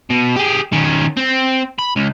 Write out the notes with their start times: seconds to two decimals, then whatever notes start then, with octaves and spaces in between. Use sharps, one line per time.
0.10 B2
0.36 G4 G#4
0.73 D#3 C#4
1.17 C4
1.79 B5
1.96 C#2